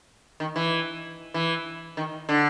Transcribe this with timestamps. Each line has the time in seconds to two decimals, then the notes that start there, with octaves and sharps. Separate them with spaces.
0.40 D#3
0.56 E3
1.34 E3
1.97 D#3
2.29 D3